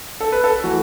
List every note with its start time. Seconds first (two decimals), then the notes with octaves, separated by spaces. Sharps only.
0.20 A4
0.32 B4
0.44 A4
0.64 E3 A3 F#4